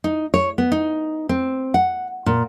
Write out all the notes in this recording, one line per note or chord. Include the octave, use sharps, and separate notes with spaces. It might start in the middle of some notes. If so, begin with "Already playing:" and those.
D#4
C#5
B3
D#4
C4
F#5
A#2